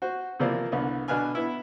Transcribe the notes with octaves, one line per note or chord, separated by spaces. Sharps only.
F#4 C5
C3 E3 F3 A#3 C5 D5
C2 D3 B3
B2 D3 D4 B4 G#5 F6
B3 E4